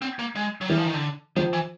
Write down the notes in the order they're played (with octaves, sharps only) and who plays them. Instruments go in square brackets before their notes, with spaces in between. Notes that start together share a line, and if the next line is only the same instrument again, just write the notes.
[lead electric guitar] C4
A#3
G#3
F#3
[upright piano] E3 [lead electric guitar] G3
[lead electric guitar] F3
D#3
D3
[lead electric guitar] D#3 [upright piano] F3
[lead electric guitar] E3